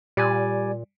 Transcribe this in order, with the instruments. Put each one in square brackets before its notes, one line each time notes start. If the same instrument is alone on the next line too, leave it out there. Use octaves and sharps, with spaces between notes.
[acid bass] A#2 [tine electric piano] G3 D5 G#5